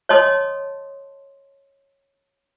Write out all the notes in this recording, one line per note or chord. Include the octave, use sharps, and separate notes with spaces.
C#5 D#5 A5 C6 D#6